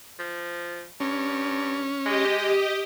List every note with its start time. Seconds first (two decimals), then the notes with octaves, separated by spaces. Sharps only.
0.19 F3
1.00 G2 C#4
2.06 G#3 G4 D#5